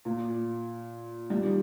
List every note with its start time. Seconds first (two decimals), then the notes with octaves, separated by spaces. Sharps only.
0.05 A#2
1.30 G3
1.44 D#3